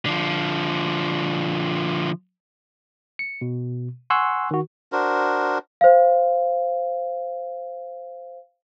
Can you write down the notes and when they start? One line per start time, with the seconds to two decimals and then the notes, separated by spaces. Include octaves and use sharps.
0.06 D3 F3
3.19 C#7
3.41 B2
4.10 F#5 G#5 C6 C#6 E6 F#6
4.51 D#3 F#4
4.92 D4 F#4 A#4 C5
5.81 C5 F5